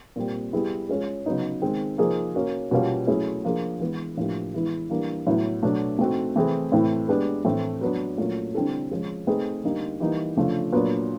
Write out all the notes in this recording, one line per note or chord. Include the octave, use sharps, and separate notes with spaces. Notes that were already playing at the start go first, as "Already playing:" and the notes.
A#2 G3 C4
G3 B3 E4 G#4
G#3 C#4 F4 G#4
C#3 F#3 B3 D#4
D#3 G#3 C4
F3 A#3 D#4 G#4 C5
A#3 C#4 F#4
B2 G3 A#3 C#4 F4
F#3 A3 C#4 E4 G#4
F3 A#3 D4 F4 G#4
E3 G#3 B3
A2 F3 A#3 D4 G4
E3 G#3 B3 E4
E3 G3 A#3 D4
A2 F#3 B3 E4
B2 F#3 A3 D4
A3 C4 D#4 F#4
E3 A3 C4 E4 G#4
A2 E3 A3 C4 E4
G#3 B3 D4 G4 B4
A2 E3 A3 C4
F#3 B3 D4
A#2 F#3 A3 C#4 F4
D3 G3 C4 E4 A4
F3 G#3 C#4
A3 C4 D#4 G#4 B4
D3 G3 A#3 D#4
E3 G3 A#3 D#4
C#3 F3 A3 D4 F4
A#2 F#3 B3 D4